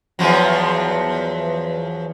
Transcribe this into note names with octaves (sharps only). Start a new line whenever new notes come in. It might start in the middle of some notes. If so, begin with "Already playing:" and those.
E2 F3 F#3